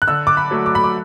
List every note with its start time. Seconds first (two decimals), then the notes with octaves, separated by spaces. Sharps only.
0.02 F#6
0.08 D3 E6
0.27 D6
0.37 B5
0.51 F#3 A3
0.66 D6
0.75 B5
0.84 D6